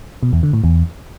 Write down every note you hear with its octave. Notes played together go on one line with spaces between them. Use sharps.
B2
E2
D3
A2
E2